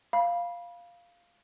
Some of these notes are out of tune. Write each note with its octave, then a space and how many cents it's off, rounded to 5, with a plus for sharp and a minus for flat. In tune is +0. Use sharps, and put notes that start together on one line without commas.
F5 +0 B5 -25